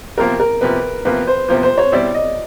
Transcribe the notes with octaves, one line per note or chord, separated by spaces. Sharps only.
E2 C3 F3 A#3 A#4
A#4
E2 C3 F3 A#3 B4
E2 C3 F3 A#3 B4
C5
E2 C3 F3 A#3 C5
C5
C#5
B2 G3 C4 E4 D5
D#5